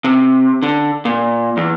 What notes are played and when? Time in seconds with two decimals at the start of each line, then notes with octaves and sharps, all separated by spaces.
0.04 C3
0.63 D3
1.05 A#2
1.57 E2